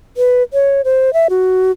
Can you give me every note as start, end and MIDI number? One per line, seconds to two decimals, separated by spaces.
0.17 0.43 71
0.53 0.82 73
0.85 1.13 72
1.13 1.27 76
1.30 1.71 66